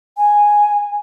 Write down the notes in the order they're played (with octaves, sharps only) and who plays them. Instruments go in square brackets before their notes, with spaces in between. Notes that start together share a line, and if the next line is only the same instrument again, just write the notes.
[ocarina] G#5